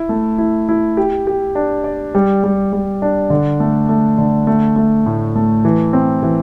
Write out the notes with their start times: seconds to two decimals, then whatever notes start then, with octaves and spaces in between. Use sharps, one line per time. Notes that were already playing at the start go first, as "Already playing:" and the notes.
Already playing: E4
0.09 A3
0.38 E4
0.69 E4
0.97 G4
1.27 G4
1.55 D4
1.84 D5
2.15 G3
2.44 G3
2.73 G3
3.02 D4
3.30 D3
3.60 A3
3.89 A3
4.18 D3
4.47 A3
4.76 A3
5.06 A2
5.36 A3
5.65 E3
5.93 C4
6.23 E3